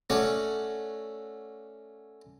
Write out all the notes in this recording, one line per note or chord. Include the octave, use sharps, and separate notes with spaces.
A3 C#4 F#4 C#5 D5